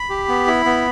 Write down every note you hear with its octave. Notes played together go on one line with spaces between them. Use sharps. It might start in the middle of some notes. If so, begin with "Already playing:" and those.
Already playing: B5
G4
B3
E4
B3